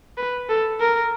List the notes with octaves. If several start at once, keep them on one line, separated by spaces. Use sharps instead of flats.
B4
A4
A#4